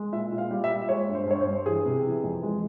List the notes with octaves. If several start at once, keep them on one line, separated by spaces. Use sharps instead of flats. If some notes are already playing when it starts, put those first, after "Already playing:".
Already playing: G#3
A#2 E5
A#2
F5
G3
E5
A#2
G#3 C#5
G2
C5
G2 C#5
C5
G2
E3 G#4
C3
E3
F2
G#3